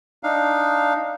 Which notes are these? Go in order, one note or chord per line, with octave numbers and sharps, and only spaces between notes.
D4 D#4 F5